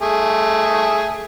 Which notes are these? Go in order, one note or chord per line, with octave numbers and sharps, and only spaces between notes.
A3 G#4